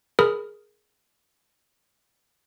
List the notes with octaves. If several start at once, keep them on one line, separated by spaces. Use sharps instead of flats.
G#4 A#4 B5 D#6 F6